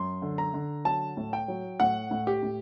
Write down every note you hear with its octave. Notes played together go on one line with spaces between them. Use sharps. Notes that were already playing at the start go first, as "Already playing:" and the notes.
Already playing: F#2 C6
D3
A#5
D3
F#3 A5
A2
G5
F#3
A2 F#5
A2
G4
A2